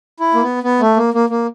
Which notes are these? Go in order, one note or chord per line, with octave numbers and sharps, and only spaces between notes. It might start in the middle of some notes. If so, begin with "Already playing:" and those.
E4
A#3
B3
B3
A3
A#3
A#3
A#3